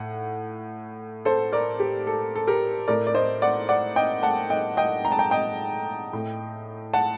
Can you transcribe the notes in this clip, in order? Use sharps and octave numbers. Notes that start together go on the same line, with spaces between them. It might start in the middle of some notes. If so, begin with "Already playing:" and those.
Already playing: A2 F#5
A4 C5
A#4 D5
G4
A4
A4
G4 A#4
A2 A#4 D5
D5
C5 D#5
D5 F#5
D5 F#5
D#5 G5
F#5 A5
D#5 G5
D#5 G5
A#5
A5
G5 A#5
D#5 G5
A2
F#5 A5